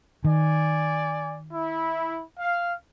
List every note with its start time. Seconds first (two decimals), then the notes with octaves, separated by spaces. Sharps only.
0.24 D#3 D5 G#5
1.52 E4
2.39 F5